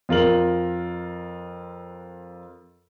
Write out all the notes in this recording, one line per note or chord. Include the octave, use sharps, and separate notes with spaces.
F2 F4 A#4 F#7